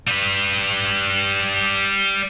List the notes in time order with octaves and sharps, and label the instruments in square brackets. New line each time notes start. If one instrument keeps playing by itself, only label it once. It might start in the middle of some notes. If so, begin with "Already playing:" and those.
[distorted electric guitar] G3 B4